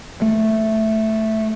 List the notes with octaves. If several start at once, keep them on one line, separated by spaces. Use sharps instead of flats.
A3